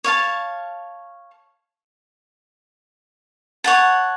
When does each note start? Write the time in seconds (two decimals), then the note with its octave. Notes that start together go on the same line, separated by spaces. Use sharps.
0.04 C#5 F5 A5
3.64 C#5 F#5 A5